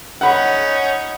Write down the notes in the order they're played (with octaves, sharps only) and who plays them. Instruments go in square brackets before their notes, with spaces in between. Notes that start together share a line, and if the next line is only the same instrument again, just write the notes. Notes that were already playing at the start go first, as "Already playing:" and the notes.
[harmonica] C#4 D#4 [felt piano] F#5 B5